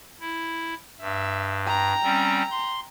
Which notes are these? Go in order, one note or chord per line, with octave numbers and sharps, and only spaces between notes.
E4
G2 E5
G5 A#5
G3 C4 C#4
C6